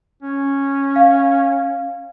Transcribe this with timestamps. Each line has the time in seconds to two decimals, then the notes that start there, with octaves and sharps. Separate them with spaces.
0.23 C#4
0.96 F5